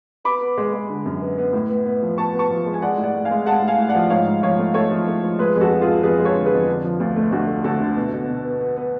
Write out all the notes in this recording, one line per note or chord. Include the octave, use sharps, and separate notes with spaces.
B3 B5 D6
B3
G#3
G#3
D3
F#2
B3
B3
A2
B3
B3
F3
B3 A5 C#6
B3
A5 C#6
F3
G#3
G#5
G#3 D5 F#5
A2
D5 F#5
A2
F5 G#5
G#3
G#3 F#5 A5
A2
F5 G#5
A2
D5 F#5
F3
G#2 C#5 F5
G#2
F3 C#5 F5
A3
A3 A4 C#5
F3
A3
F3
G#3 G#4 B4
F2 G#4
F#4 A4
F3
F4 G#4
G#3
F2 G#4 B4
G#3
A4 C#5
D3
G#4 B4
F2
D3 D4
F3
D2 F4
A3
D2 D4 F#4
A3
D2 F#4 A4
D3
B2
B2
B2
B3
B3
B3